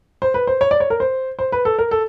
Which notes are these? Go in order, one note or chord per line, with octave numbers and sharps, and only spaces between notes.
C5
B4
C5
C#5
D5
C#5
A#4
C5
C5
B4
A4
A#4
A4